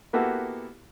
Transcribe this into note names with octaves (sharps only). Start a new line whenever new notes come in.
A#3 B3 E4 F#4 G4 A4